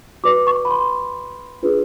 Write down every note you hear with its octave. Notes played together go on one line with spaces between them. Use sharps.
F#4 B4 D5 D6
C#6
B5
C6
D4 F4 G#4 B4